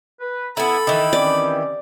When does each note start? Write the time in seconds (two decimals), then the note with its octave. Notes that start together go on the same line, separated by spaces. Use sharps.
0.21 B4
0.57 B3 E4 A4 B5
0.87 D#3 E3
1.13 C4 C#4 G4 D5